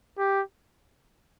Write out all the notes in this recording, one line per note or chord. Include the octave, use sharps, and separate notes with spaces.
G4